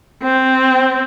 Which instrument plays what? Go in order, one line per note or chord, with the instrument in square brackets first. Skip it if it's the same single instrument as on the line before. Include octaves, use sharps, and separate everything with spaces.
[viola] C4